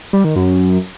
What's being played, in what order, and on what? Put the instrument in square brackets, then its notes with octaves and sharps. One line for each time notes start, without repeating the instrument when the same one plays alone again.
[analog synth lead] G3
D#3
F#2